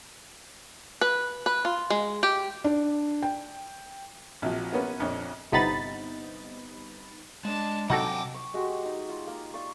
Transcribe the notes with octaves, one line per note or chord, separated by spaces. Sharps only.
B4
B4
F4
G#3
G4
D4
G5
A#1 C3 F3 F#3
A#3 B3 C#4 B4
A#1 F2 D4 C#5
G1 C3 B3 D#4 B5 A6
G#3 D4 A5
C3 F#3 D#4 F#4 A4 F#5 G5 D6
C#6 E6
G#3 F#4 G4
D#4
F4
A#3
D5 F5 C#6